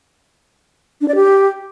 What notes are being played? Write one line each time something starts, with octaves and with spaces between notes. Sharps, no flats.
D4
D5
G4